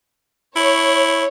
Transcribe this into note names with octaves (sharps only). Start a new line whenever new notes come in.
E4 C#5